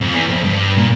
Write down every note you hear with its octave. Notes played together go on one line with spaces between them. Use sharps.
F2
E2
F2
G2
A#2